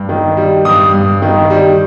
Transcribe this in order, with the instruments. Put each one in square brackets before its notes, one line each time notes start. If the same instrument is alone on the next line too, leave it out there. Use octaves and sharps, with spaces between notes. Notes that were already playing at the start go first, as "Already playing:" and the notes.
Already playing: [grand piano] G2
D#3
G3
G2 D#6
G2
D#3
G3